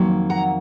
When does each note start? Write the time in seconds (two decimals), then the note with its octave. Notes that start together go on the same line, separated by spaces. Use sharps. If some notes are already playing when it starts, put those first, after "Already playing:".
Already playing: F2 D#3 F#3 A#3
0.30 F#5 A#5